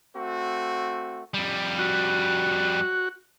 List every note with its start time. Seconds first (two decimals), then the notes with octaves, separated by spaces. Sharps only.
0.15 A3 C4 F#4
1.34 F2 G3
1.79 F#4